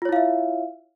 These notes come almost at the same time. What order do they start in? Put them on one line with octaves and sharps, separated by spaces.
F4 C#5 E4 F5 E5